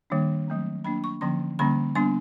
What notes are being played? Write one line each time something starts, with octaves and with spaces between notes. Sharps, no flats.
D#3 G3 A#3 D4
F#3 A3 C4
F#3 A#3 D4 B5
C#6
D3 F3 A#3 C#4 C6
D3 G3 A#3 C#4 B5
G3 B3 D4 C6